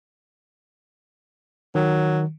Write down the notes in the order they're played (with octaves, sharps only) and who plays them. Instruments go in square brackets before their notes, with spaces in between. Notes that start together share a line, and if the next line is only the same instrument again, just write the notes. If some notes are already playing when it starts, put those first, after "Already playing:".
[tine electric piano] D#3 [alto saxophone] F#3